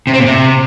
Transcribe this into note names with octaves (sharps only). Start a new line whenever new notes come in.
C3
C4
A#2
C3